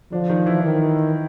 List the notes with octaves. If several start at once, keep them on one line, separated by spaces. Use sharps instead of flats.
D3 F3 D4
D#3 D#4
E3 E4
D#3